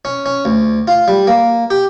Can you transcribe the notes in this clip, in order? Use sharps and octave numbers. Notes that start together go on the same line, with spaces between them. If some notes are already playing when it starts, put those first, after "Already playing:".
C#4
C#4
D2
F4
G3
A#3
G4